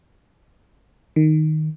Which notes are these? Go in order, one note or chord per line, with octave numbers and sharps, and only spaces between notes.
D#3